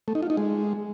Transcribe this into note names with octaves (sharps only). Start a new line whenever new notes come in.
A3
D#4
F4
D#4
G#3